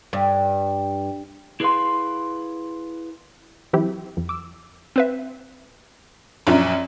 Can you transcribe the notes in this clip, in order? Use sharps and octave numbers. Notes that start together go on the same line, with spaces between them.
G2
E4 G#4 B4 C#5 F5 C6
E3 F#3 C4 E4 G4
F2
D6 E6
C4 B4 E5
A#1 F#2 F4 E5 A#5